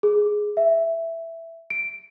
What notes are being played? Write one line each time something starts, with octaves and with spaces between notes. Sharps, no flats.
G#4
E5
D7